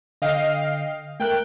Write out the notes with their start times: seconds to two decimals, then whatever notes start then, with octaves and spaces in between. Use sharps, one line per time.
0.22 D3 D#5 F5 G5
1.20 A3 A#4 G5 F#6